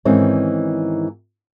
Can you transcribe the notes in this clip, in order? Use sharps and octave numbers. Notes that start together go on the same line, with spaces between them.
G#2 D#3 E3 C4 C#4